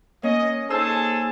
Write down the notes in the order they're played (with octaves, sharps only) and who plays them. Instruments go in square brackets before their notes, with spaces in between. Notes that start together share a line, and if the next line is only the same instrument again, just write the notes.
[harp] A#3 C#4 [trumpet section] D#5
[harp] D#4 C5 E6 [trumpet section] G#4 A4 A5